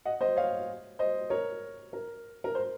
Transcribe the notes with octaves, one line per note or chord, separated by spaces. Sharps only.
D#5 F#5
C5 D#5
C#5 F5
C5 D#5
A#4 C#5
A#4
A#4
C5